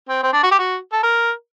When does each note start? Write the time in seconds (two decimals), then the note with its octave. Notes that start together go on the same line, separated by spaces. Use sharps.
0.09 C4
0.23 C4
0.32 D4
0.43 F#4
0.51 G4
0.58 F#4
0.92 A4
1.03 A#4